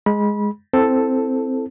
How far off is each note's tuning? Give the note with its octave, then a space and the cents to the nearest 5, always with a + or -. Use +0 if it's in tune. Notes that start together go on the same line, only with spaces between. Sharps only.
G#3 +0 B5 -25
C4 +0 E4 +0 A4 +0